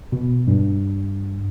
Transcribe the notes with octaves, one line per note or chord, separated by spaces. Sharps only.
B2
G2